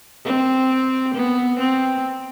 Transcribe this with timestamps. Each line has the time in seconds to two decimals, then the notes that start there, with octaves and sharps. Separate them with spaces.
0.25 C4
1.14 B3
1.59 C4